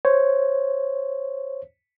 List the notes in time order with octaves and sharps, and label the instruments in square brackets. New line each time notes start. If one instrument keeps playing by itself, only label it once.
[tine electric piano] C5 C#5